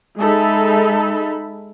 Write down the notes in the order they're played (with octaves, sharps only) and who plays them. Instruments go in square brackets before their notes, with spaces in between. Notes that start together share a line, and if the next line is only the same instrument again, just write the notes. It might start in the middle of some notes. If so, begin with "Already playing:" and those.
[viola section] G#3 D#4 A4 E5 B5